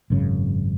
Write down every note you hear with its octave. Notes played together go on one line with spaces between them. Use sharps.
G#1 F#2 C#3